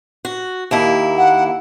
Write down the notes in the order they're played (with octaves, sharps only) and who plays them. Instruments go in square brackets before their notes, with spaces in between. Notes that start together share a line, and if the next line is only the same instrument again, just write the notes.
[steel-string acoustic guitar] F#4
D#2 A#3 E4
[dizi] F#5